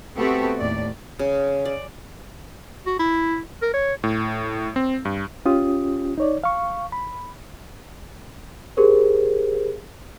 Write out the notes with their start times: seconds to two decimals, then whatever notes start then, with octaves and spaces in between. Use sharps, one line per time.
0.17 A3 B3 C4 F#4 G4 A4
0.59 D#2 A2 D5
1.19 C#3
1.65 D5
2.87 F#4
2.99 E4
3.62 A#4
3.73 C#5
4.04 A2
4.76 C4
5.05 G2
5.45 C#4 F4 G4 D#6
6.18 D#4 C#5 D5
6.44 F5 C#6
6.92 B5
8.77 G4 G#4 A#4 C5